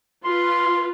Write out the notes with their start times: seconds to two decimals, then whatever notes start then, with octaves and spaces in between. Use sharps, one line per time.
0.25 F4 B4 C6